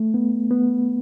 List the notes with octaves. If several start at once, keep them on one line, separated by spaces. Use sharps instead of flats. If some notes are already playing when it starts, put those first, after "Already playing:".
Already playing: A3
B3
B3